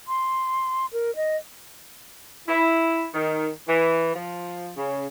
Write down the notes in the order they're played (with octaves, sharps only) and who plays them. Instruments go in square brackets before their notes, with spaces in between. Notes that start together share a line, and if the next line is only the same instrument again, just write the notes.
[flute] C6
A#4
D#5
[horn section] E4
D#3
E3
F3
C#3